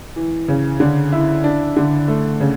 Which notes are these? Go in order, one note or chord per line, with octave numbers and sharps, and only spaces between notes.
E3
C#3
D3
E4
D4
D3
A3
C#3